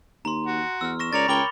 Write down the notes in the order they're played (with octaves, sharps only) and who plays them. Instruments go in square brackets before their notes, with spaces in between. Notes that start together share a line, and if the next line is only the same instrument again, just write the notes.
[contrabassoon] D#2 [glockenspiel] A#5 C6
[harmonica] F#4
[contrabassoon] E2 [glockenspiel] E6 F6
[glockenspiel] C#6 A#6 E7
[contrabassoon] C#2 [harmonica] A#4 C#5 D5 [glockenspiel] A6 C#7 F7
[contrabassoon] C#2 [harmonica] A#4 C#5 G5 [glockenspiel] B5 D6 G7